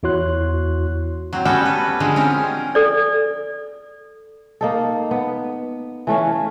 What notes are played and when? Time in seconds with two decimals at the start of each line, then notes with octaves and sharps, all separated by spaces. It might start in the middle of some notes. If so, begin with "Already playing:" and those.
0.03 E2 E4 F#4 C#5 C6 F#6
1.33 F#3 C4
1.45 G3 B3 C#4 F#4 A4 G5
1.65 B4
2.00 D3 F3 G#3 C#5
2.16 C4 C#4 A#4
2.75 A4 D5
4.61 A#3 D#4 A4
5.11 B3
6.07 E3 A3 C#4 F5